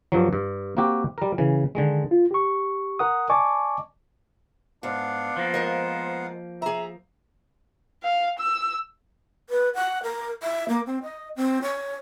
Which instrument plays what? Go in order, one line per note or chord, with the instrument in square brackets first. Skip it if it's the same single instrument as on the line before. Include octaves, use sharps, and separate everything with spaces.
[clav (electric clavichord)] G2 F3 F#3
G2
A#3 C4 F#4 G4
G3 A#4
C#3 E3
D3 D#3 G#3
[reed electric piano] F4
G4 C#6
A#4 F#5 D#6
D5 D#5 G#5 A5 C#6 D6
[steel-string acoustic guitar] G#2 [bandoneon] B3 F5 F#5 [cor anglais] D4
[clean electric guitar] F3 A#3 [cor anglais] C5
[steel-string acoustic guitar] G#3 A#4 D#5
[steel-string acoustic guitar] G#4 A#5 [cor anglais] E5
[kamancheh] F5
E6
[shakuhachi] B4
F#5
A#4
E5
A#3
C4
D#5
C4
C#5